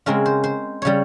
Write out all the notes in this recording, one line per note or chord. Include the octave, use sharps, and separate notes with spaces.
C#3 G#3 C4 A#4
C5
C5
C#3 G3 C#5